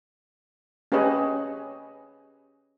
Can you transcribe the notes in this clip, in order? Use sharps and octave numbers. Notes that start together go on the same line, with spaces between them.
C#4 G4 G#4 B4 C#5 D#5